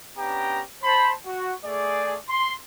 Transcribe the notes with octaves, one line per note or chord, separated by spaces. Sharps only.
B3 C#4 D4 G4 G5 A#5
C5 A5 B5
F#4
A3 G#4 D5
C6